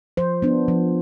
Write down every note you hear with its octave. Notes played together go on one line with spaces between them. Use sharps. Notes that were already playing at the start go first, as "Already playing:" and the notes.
F3 C5
B3 D4
F3